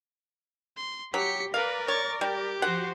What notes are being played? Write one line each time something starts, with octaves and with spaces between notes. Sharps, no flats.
C6
F#3 G4 B6 C#7
A#4 B4 D5 F5
C#5 C#6 A6
G3 G4
F3 F#4 C5 F#5